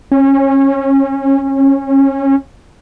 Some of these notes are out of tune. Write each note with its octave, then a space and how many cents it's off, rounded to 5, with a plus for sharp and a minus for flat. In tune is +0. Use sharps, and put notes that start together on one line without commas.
C#4 -25